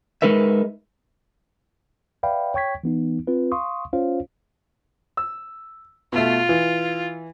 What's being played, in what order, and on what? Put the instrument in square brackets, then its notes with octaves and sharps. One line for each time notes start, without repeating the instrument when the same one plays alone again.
[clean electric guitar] G#3 D#4 A#4 B4 E5
[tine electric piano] B4 D5 E5 F5 G5 B5
C#5 G5 C#6 G#6 B6
E3 B3 D#4
C4 F4 B4
F5 C6 C#6 D#6
C#4 F4 C5 C#5 F5
[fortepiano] E6
[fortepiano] B2 A3 [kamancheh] F4
[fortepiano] E3